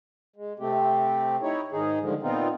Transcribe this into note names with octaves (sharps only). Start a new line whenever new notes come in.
G#3
C3 A3 C4 G4
D#4 E4 C#5
G#2 D#3 D#4 G#4
G2 D3 D#3 F3 G#3
A#2 B3 C4 D#4 F4